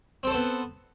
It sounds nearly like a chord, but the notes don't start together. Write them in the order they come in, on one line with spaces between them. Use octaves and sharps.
C4 A4 C5 B3